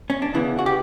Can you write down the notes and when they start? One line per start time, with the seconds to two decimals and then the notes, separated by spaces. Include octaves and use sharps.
0.10 C#4
0.22 D4
0.34 E2 C#3 E3 B3 E4
0.59 F#4
0.66 G4